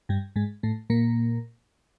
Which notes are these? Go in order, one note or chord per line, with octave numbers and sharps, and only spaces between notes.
G2 G3
G#2 G#3
A2 A3
A#2 A#3